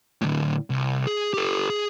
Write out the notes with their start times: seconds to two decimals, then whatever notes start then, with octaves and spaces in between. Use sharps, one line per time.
0.21 A2 D3
0.70 C2
1.07 G#4
1.34 G4 A4
1.70 G#4